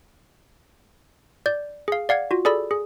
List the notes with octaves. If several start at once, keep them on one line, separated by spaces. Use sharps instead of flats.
D5 G6
G#4 F5
D5 F5 F#5 G#6
F4 F#4
G#4 A4 D5 B5 E6
G#4